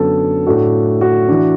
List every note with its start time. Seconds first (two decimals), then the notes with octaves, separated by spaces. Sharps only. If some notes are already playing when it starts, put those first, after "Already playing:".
Already playing: F#2 D3 F#3 B3 A4
0.46 A2 A3 D4 F#4
1.01 F#4
1.29 E3 D4